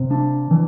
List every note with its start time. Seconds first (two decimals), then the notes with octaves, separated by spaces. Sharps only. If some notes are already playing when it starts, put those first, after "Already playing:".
Already playing: C3
0.11 D4
0.51 E3